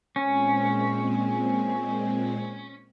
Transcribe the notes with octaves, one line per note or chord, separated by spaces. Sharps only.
A#2 G#3 C4 C#4